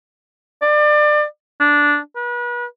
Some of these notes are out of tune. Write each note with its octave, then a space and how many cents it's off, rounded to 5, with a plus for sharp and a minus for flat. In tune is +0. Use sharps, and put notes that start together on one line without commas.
D5 +30
D4 -5
B4 -35